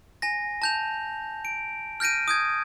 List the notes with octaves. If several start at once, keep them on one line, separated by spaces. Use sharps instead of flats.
G#5 A#6
A5 G6 F7
D7
F6 G6 A#6 D7 D#7
D#6 G6 G#6